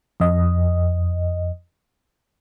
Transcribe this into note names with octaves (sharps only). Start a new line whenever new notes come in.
F2 D#5